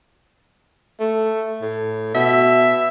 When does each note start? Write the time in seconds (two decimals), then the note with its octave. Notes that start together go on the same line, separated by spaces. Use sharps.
1.00 A3
1.62 A2
2.15 B2 E5